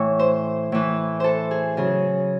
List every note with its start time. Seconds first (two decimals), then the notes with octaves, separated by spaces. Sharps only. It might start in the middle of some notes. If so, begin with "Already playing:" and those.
Already playing: A2 E3 C#5
0.19 C5
0.72 A2 E3
1.20 A4 C5
1.51 G#4
1.77 C#3 F#3 G#4